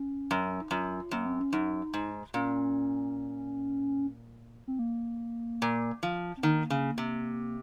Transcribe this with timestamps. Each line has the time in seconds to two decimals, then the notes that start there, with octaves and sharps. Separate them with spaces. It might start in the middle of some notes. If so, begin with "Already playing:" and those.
Already playing: C#4
0.31 F#2
0.61 D#4
0.71 F#2 F4
1.11 F#2 A#3
1.26 C4
1.40 C#4
1.53 F#2 D#4
1.94 G#2
2.34 A#2 C#4
4.68 C4
4.79 A#3
5.62 A#2
6.03 F3
6.37 C4
6.43 D#3 A#3
6.70 C#3
6.98 C3